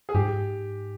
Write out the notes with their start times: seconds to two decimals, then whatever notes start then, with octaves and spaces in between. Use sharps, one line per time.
0.09 G#4
0.14 G#2 G4